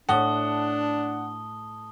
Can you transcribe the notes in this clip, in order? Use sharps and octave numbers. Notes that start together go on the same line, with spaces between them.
A2 D4 F#5 A5 D#6 G7